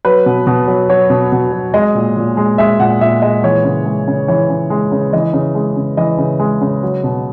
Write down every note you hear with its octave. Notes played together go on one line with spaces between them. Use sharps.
F#3 B4
B2
B2
F#3
F#3 C#5
B2
B2
F#3
G#3 D#5
A#2
A#2
G#3
G#3 E5
A#2 F#5
A#2 E5
G#3 D#5
E3 C#5
C#3
G#3
C#3
E3 C#5
C#3
G#3
C#3
E3 D#5
C#3
G#3
C#3
E3 D#5
C#3
G#3
C#3
F#3
B2